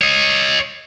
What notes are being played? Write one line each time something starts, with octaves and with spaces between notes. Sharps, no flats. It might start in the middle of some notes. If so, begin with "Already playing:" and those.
C#5 D#5